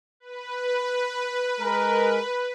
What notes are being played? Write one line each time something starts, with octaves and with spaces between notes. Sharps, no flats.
B4
G#3 A#4